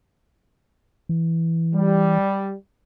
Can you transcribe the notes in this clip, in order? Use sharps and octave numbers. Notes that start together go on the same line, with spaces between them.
E3
G3